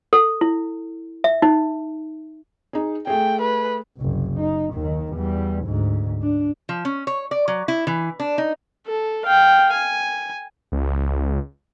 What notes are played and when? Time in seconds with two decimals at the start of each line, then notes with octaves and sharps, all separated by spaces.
0.13 A4
0.41 E4
1.24 E5
1.42 D#4
2.73 D#4 G#4
3.07 A3 G#4 G5
3.41 B4
3.97 F#1 C2
4.40 D#4
4.74 D#2 D#3
5.13 E2 G3
5.65 D2 G#2
6.22 D4
6.69 F3
6.85 C#4
7.07 C#5
7.31 D5
7.48 F#3
7.68 E4
7.87 E3
8.20 D4
8.38 D#4
8.87 A4
9.26 F5 G5
9.73 G#5
10.72 C#2